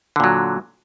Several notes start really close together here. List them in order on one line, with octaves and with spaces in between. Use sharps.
D3 A#2 F#3